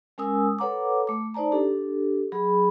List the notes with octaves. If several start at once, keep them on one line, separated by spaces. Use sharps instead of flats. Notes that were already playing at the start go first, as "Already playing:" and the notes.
G#3 C#4 A#4 G#5 D#6 E6
A4 B4 C#5 F#5 A#5 D6
A3 D6
D#4 C5 D5 A5 A#5
D4 G4 A4
F#3 G#4 B5